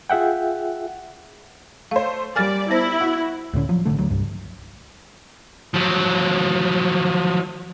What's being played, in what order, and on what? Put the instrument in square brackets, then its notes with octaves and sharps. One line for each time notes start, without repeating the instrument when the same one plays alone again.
[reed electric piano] F4 G#4 E5 F#5 G5
[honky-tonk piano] A3 C5 [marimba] F5
[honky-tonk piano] G3 A#3 [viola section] D5 [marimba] G#5 F6 A6
[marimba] B3 C5 A#6 [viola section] E4
[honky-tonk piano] F#4
[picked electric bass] C#2 A2 D3 C#4
F3 F#3
A1 G2 D3 A3
D2 F#3
C2 G2
[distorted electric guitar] F3 F#3